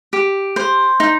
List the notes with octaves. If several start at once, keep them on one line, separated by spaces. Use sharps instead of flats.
G4
C5
D#4